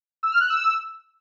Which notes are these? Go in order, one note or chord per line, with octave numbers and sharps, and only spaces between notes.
E6
F6
F#6
E6